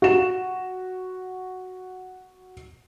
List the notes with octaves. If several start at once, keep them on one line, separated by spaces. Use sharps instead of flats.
F#4 E7